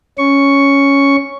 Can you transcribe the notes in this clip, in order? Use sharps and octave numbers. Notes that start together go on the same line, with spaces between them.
C#4 C#6